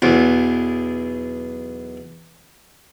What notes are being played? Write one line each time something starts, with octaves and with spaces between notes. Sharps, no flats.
B1 E2